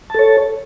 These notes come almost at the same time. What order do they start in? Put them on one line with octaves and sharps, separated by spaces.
A5 A4 C#5